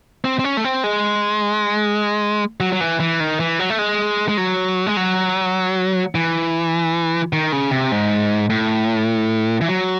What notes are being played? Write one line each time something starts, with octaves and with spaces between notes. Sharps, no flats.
C4
C4
C#4
A3
C4
G#3
F#3
F#3
E3
E3
D#3
E3
F#3
A3
G#3
G#3
F#3
G#3
F#3
E3
D#3
C#3
C3
G#2
A2
E3
F#3